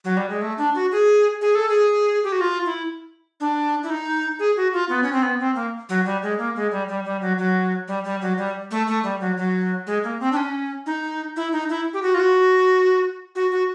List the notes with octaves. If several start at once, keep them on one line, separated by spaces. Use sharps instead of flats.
F#3
G3
G#3
A3
D4
F#4
G#4
G#4
A4
G#4
G4
F#4
F4
E4
D4
E4
D#4
G#4
F#4
F4
B3
C#4
C4
B3
C4
A#3
F#3
G3
G#3
A#3
G#3
G3
G3
G3
F#3
F#3
G3
G3
F#3
G3
A3
A3
G3
F#3
F#3
G#3
A#3
C4
D4
C#4
D#4
E4
D#4
E4
G4
F#4
F4
F#4
F#4
F#4